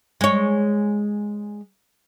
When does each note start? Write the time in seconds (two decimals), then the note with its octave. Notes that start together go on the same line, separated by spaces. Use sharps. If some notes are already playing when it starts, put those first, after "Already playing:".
0.21 G#3 C#5